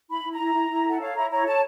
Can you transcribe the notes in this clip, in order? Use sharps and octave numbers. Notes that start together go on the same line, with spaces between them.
E4 B5
E4
A#5
E4
E4
E4
A4 F#5
C#5 F5
E4 A#5
C#5 A#5
A4 A5